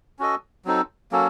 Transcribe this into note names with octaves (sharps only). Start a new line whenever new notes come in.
C#4 F#4 A4 D#5
F#3 C4 D#4 A4
F#3 A#3 C#4 A4